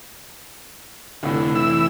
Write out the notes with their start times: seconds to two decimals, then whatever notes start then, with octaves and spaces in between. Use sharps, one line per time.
1.23 F1 A2 D3
1.55 E3 E6